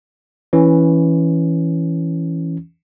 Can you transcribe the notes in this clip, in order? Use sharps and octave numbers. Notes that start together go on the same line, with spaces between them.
E3 C#4